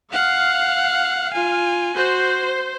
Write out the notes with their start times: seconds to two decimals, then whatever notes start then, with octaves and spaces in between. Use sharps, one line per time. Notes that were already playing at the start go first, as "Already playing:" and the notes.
0.13 F5 F#5
1.33 F4 G#5
1.95 F#4 C5